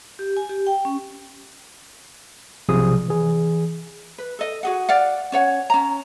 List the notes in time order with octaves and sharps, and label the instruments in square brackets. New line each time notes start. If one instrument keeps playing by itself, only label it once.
[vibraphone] G4
G#5
G4
G5
C#4
[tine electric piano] B1 C3 F3 G#4 D#6
E3 G#4
[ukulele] B4
A4 D#5
F#4 G#4 F#5
D5 F5 F#5
C#4 C#5 F#5
C#4 A#5